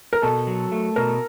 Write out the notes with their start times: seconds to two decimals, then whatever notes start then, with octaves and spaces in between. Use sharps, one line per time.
0.13 A#4
0.22 B2 A4
0.47 F#3
0.72 A3
0.96 B2 A#4